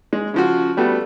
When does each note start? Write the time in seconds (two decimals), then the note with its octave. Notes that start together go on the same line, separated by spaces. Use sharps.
0.13 G#3
0.34 C#3 F3 F#4
0.77 G3 A3 B3 F#4